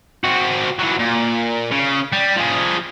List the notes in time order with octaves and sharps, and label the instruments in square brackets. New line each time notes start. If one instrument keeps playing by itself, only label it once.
[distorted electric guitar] C4 F#4
E3 F#3
A#2
C#3
G3
F3 G#4